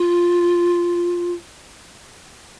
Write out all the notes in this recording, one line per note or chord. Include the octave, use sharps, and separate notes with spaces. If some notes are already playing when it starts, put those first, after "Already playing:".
Already playing: F4